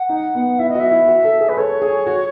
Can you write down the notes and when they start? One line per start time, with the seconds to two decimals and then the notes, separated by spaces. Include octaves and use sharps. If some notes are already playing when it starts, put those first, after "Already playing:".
Already playing: F#5
0.09 D#4
0.35 B3
0.59 E4 E5
0.69 D#5
0.75 F#4
0.79 E5
0.91 E4
1.08 F#4
1.24 A4
1.41 G#4
1.49 B4
1.57 A4 C#5
1.82 G#4
2.07 F#4